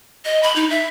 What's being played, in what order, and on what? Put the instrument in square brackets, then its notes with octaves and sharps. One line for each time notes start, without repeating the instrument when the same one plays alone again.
[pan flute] D#5
B5
D#4
E5